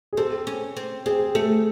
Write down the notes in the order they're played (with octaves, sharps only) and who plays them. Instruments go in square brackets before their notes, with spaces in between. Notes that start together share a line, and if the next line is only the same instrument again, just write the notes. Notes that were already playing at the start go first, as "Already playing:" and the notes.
[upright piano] G#4
[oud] C4 [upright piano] A4
[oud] C#4
C4
[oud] C4 [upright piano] G#4
[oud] A3 [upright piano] A4